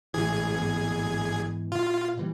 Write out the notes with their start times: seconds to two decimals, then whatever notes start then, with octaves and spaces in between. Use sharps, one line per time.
0.14 A1 A2 E3 G#4 G#6
0.57 G#2 E3 B3
1.72 A#2 F4
2.17 A#2 E3 G3